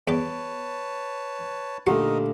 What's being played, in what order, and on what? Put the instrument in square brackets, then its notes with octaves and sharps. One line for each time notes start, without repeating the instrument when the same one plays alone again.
[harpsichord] E2 G5 D6 [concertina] B4 C#5 A5
[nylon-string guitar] A#2 D3 A3 [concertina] D#4 A#4 D#5 [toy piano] G4 [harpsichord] F#5